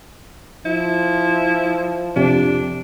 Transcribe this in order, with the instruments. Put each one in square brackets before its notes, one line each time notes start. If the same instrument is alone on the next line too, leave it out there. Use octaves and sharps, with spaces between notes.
[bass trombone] F3 [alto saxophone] E4
[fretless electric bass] F2 C3 [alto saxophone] D4